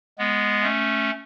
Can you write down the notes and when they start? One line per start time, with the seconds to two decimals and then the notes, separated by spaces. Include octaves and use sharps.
0.18 G#3 B3
0.63 A3 C#4